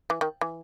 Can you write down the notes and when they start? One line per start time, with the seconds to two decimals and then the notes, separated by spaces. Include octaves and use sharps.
0.10 E3
0.21 D#3
0.41 E3